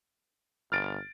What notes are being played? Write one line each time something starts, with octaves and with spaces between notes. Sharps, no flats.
G1 F6 A6 D7